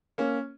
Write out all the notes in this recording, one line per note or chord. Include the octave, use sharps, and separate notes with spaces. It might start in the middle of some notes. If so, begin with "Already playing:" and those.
A#3 C#4